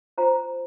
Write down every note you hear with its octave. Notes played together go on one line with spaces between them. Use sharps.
F4 C5 A#5